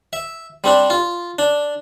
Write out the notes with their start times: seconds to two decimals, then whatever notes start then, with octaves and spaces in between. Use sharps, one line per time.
0.13 E5
0.64 G3 C4 D4
0.90 F4
1.39 D4